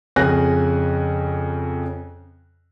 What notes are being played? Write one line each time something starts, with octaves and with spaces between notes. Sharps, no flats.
F2 C#3 C#4 G#5 F#6 A#6